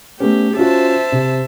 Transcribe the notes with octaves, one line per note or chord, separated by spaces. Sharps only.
A3 B3 C#4 G4
C#4 F4 F#4 C5 E5 A5
C3